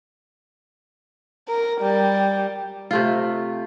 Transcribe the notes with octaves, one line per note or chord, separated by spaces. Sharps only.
A#4
G3
C3 A3 F4